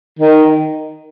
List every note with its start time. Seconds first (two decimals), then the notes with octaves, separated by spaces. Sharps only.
0.19 D#3